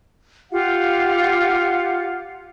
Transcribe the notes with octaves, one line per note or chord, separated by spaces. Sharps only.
F4 G4 F5 F#5